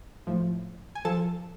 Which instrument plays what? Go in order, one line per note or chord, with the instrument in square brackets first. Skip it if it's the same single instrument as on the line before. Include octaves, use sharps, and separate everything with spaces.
[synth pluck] A2 F3
G#5
F3 A4 A5